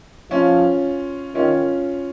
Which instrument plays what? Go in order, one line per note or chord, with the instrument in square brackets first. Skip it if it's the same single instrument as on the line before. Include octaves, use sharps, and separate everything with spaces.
[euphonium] F3 [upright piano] C#4 F4
[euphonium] D#3 [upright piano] C#4 F4